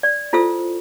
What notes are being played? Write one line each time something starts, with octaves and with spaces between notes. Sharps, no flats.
D5
E4 F4 A4 C5 E6